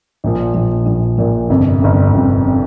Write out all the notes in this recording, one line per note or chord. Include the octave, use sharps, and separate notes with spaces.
A#1 A#2 F3
A#1 A#2 F3
A#1 A#2 F3
A#1 A#2 F3
G1 F2 C3
G1 F2 C3
G1 F2 C3
C3